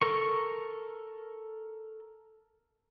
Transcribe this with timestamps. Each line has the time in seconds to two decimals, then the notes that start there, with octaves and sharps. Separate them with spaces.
0.02 A4 A#4 C#6